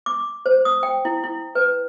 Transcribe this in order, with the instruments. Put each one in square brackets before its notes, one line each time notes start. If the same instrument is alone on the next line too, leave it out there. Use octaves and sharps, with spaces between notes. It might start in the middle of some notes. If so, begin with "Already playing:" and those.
[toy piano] D6
C5
D#6
G5
E4
E4
B4